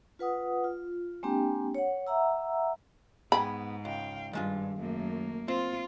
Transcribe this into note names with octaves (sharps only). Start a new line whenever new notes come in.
F4 B4 F#5 D#6
F4
G#3 A#3 C4 D4 G4 G5
C#5 F#5
E5 F#5 A#5 E6
G#2 B3 G#4 G5 B5
C#2 F5 G5
G2 D#3 G#3 F4
F#2 A3 A#3
C4 F4